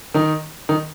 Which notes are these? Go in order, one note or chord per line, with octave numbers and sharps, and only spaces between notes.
D#3 D#4
D#3 D#4